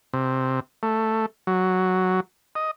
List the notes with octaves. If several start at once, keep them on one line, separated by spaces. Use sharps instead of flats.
C3
A3
F#3
D#5